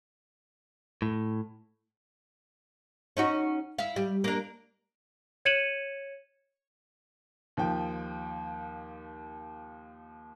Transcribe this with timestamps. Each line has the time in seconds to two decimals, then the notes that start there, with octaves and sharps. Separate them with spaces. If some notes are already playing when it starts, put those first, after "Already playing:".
1.02 A2
3.17 C#4 D#4 F#4
3.79 E4 F5
3.96 G3
4.24 A#3 D4
5.45 C#5 G#6 C#7 D#7 E7 F#7
7.57 D#2 F3 G5